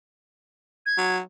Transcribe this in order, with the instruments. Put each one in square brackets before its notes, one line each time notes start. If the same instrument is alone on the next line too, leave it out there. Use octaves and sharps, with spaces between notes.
[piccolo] G#6
[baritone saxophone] F#3